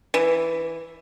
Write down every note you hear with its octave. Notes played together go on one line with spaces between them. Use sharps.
E3